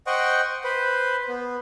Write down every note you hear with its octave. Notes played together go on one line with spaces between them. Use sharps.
C5 D#5 F#5 G5 C#6
B4 C5
B3